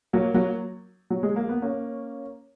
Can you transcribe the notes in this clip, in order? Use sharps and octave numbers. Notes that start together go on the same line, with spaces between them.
F#3 A#3
F#3 A#3
F#3
G#3
A#3
B3
A#3 C#4